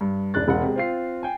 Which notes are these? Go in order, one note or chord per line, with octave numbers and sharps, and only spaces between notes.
G2
E1 D4 F#6 A6
E1 F#5
C3 G#3
C4 F4 C7
G5 G#5